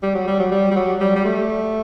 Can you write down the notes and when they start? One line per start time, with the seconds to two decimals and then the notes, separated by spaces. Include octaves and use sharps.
0.03 G3
0.15 F#3
0.27 G3
0.39 F#3
0.51 G3
0.71 G3
0.76 F#3
1.00 G3
1.15 G3
1.25 A3